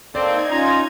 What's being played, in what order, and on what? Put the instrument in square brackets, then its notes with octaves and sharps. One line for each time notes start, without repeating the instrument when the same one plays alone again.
[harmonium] A#3 A4 [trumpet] C4 [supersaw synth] D#4 G#6 [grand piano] D5
[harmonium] C#4 F4 [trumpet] A#5